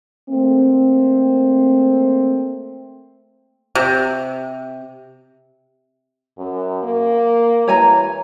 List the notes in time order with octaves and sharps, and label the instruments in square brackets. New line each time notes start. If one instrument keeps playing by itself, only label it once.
[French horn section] A3 A#3 C4
[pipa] C3
[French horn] F#2
A#3
[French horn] E3 [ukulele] C#5 G#5 A#5